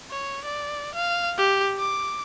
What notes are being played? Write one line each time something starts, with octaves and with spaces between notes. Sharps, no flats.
C#5
D5
F5
G4
D6